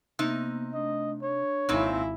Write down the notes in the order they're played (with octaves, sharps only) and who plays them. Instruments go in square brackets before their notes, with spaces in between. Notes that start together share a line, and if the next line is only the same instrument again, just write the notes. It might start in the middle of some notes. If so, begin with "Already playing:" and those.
[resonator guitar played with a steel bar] C3 D#4 [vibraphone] A#3 B3
[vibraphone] A3 D4 [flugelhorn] D#5
[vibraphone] D4 [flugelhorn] C#5
[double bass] G#1 E4 [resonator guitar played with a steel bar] A#2 C4 D#4 [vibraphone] F5 G#5